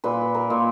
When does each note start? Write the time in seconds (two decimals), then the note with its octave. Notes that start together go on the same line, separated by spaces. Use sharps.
0.04 A#2 B4
0.35 A#4
0.50 A#2